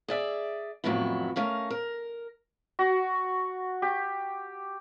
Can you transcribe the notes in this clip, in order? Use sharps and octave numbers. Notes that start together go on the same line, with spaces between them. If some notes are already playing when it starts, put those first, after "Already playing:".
G#4 D5 E5
F2 A2 D#3 F#3 B3 E4
A3 C#4 A#4 F5
A#4
F#4
G4